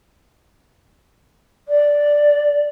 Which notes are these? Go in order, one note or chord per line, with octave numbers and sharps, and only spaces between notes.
D5